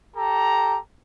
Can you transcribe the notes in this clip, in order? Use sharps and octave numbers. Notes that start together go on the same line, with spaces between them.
G4 A4 A#5